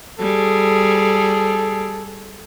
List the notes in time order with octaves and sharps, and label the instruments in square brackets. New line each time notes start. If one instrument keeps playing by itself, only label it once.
[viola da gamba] G3 G#4 [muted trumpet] A4